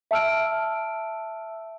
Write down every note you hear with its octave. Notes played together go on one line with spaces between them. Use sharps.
E5 A5 E6 F6 D7